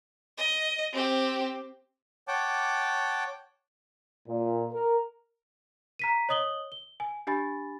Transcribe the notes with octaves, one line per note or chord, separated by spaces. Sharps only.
D#5
C4 G4
C#5 F#5 G5 A5 D6
A#2
A#4
A#5 B6 D#7
C#5 D#5 D#6 F#7 G7
G7
G#5
D4 G4 G#5 B5 A6